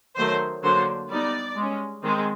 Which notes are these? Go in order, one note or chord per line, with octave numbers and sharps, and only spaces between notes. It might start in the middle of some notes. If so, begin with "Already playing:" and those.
D#3 F#3 A3 C5
D3 F#3 A#3 D4 C5
G3 B3 D#4 D5
G#3
C#4
D#3 G#3 C4